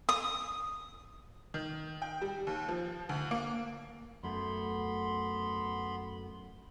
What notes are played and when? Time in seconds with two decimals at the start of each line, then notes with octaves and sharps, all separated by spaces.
0.09 D#6
1.54 D#3
2.02 G5
2.22 G3
2.47 D#2
2.68 F3
3.09 D2
3.31 A#3
4.24 F#2 A3 B3 B5 C6